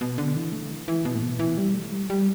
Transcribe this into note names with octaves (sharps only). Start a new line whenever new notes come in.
B2
D3
E3
A3
E3
E3
B2
A2
B2
E3
G3
A3
G3
G3